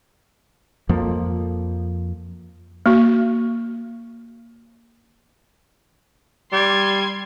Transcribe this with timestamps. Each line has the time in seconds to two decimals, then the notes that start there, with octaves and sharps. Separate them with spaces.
0.89 F2 F3 A#3
2.86 A#3 F#4
6.52 G3 C6 G#6